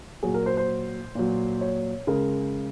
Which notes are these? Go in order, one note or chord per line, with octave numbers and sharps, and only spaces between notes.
A#2 F#3 G#4
A#4
C5
C5
A#2 F#3
C#5
C#3 G#3 A#4